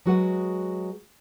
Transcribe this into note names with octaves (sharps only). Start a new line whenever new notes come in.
F#3 G#3 F#4 G#4 B4 F#5